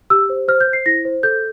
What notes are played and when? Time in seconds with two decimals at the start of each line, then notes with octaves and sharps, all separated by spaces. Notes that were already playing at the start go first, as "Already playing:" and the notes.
0.10 G4 E6
0.30 C5
0.48 C5 F6
0.60 G6
0.67 C5
0.73 C7
0.86 E4 A#6
1.05 C5
1.23 A4 G6